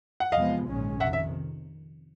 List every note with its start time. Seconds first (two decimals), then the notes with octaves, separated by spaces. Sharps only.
0.20 F#5
0.32 E2 C3 F3 G#3 B3 D#5 F5
0.66 A#1 G#2 D#3 G#3 C#4
1.00 F2 C3 D#3 E5 F#5
1.13 E5